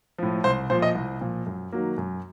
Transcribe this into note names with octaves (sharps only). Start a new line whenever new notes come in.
A2 F3
C2 C5
A#2 F3 C5
D#5
C2
A#2 F3
F#2
D#3 F#3 A#3
F#2